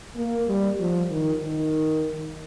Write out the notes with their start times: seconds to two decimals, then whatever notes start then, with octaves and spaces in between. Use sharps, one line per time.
0.16 A#3
0.48 G3
0.79 F3
1.11 D#3
1.43 D#3